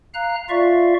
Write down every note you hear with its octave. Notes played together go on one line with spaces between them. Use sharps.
F5 A#5 F#6
F4 D5 E5 F5 C#6